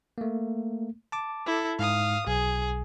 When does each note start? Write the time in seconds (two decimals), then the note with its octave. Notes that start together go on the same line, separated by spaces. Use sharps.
0.18 A3 A#3
1.12 A5 D6
1.46 E4 A4
1.79 G#2 F5 D#6
2.27 B1 G#4